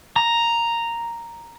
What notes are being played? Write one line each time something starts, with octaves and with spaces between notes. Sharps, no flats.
A#5